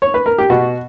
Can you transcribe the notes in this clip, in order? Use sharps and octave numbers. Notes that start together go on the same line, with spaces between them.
C#5
B4
A#4
G4
B2 F#4